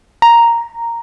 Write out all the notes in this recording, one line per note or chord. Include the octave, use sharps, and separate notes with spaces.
A#5